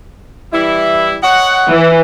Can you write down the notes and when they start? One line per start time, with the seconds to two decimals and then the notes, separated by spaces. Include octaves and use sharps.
0.53 E3 G3 E4
1.23 C#5 D#5 F#5
1.70 E3